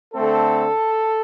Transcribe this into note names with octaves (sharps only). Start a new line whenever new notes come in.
D3 A3 C4 A4